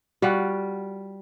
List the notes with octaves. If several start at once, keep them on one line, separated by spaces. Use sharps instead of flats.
G3 F4 F#4 F#5